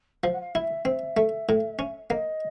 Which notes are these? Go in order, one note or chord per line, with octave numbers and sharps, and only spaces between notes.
F3 F5
F#5
F5
E4 E5
C4 E5
A3
A2
C#4
A#3 D#5